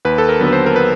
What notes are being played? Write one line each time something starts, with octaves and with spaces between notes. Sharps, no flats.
D#2 B4
A4
A#4
D3 F#3 B3
B4
C5
A#4
B4